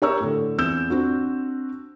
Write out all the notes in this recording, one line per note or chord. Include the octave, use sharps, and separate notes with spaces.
G4 A#4 C#5 A#5 C#6 E6
A2 D3
E2 C4 E6 G6 E7
C4 D4 F#4